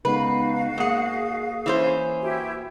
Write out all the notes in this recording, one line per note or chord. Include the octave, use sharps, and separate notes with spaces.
C#3 G#3 B3 D#4 F#4 B4 F5
G#2 A#3 G#4 F#5 D#6
E3 C#4 C5
E4 F#4 G4